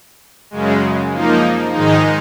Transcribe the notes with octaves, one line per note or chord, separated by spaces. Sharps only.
F#2 C#3 G#3
F3 A#3 D#4
G#2 D#3 G#3 D#4